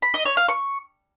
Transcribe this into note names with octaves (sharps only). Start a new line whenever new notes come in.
B5
D#5
C#5
F5
C#6